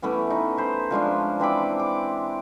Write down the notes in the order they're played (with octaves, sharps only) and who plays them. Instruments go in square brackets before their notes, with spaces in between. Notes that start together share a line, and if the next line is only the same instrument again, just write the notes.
[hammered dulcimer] E3 A3 B3 C#4
D#4
B4 C5
F3 G#3 C#4 D4
E3 C4 B5 D6
D6